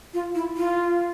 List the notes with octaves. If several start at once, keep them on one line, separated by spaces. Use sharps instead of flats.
F4
E4
F4